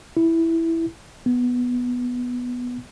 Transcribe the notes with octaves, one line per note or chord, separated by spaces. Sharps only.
E4
B3